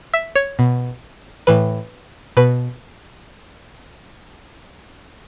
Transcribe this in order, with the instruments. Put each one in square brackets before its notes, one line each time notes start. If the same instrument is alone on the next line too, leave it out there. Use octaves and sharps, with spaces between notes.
[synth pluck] E5
C#5
B2
A2 E3 B4
B2 B4